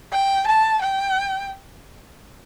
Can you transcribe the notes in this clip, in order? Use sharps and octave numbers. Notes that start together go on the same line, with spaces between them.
G5
A5
G5